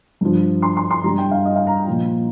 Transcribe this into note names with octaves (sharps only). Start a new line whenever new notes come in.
G2 F3
C6
C6
C6
G2 G3 A#5
G5
F5
D#5
F5
A#5
A#2 F3